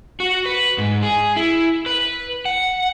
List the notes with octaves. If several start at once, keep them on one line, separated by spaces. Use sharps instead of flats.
F#4
B4
G#2
G#4
E4
B4
F#5